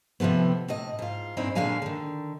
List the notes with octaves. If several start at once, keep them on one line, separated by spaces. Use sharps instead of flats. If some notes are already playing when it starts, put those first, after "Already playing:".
C3 D#3 F3 A3 B3
A2 C3 D#5
G#2 F4
E2 G2 A#2 C4 D#4 E4
A#2 D3 F#3 G#3 F5 G#5
D3 D#3